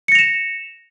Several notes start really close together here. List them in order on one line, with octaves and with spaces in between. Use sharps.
C#7 A#6 F7 E7